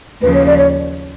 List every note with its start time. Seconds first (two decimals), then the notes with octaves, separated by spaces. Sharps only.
0.22 D#2 C#3 F3 B4
0.34 C#5
0.46 D5
0.57 C#5